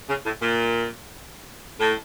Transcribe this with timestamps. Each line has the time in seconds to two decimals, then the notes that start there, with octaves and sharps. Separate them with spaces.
0.09 C#3
0.25 A2
0.42 A#2
1.80 A2